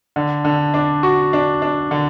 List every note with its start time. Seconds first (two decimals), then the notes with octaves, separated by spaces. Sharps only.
0.16 D3
0.45 D3
0.74 D4
1.03 F#4
1.33 D4
1.62 D4
1.91 D3